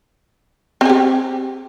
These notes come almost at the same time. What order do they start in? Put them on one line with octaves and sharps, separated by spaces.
C4 G#4 G4